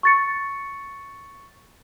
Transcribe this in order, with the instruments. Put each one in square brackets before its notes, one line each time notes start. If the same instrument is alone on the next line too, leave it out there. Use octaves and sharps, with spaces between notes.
[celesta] C#6 A6 C#7